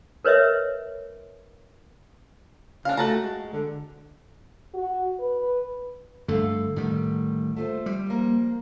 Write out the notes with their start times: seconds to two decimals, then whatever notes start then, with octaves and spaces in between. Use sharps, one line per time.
0.25 A#4 B4 C#5 D#5 E5
2.85 C#3 D4 F5
2.97 A3 F#4 A5 A#5
3.23 G#3
3.53 D3
4.74 F#4
5.20 B4
6.28 G2 D3 A3 A4 F5
6.76 A2 D3 D#3 G3
7.56 A3 F4 C5
7.86 G3
8.07 F3 A#3